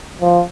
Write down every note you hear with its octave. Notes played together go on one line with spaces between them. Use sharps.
F3